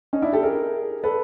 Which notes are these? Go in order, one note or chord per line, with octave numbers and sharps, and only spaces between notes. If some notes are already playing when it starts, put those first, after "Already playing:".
C#4 D#4
D4 E4
G4 A4
G#4 A#4
A4 B4